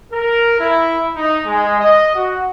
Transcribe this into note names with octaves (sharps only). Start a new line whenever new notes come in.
A#4
E4
D#4
G#3
D#5
F#4